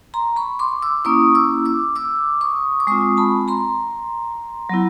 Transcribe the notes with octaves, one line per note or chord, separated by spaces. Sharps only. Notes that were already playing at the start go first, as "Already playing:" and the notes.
A#5 C6
B5 C#6
C6 D6
D6 E6
A#3 C#4 E4 C#6 D#6
D6 E6
D6 E6
D6 E6
C#6 D#6
D6
G#3 C4 F4 C#6 D#6
A5 B5
A#5 C6
F#3 B3 E4